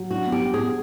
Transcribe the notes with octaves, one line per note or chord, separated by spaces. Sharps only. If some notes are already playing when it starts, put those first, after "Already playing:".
Already playing: F#3
D4 F#4
B3
G4
G3
B3 G#4